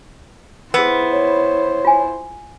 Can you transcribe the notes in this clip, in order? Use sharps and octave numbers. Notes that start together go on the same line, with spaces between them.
B3 E4 G#4 C5 E6
C#5
F4 G#5